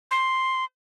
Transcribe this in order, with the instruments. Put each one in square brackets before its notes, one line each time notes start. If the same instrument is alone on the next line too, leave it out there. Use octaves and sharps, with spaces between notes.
[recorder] C6